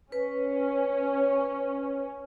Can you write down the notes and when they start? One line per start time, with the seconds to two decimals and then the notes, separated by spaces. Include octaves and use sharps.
0.12 C#4 B4